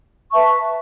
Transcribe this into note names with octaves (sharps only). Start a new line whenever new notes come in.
B4 E5 A5 C#6